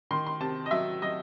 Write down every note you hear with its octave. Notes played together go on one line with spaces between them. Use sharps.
D#3 C6
C6
C3 A5
D#5
F#3 E5
F#3 D#5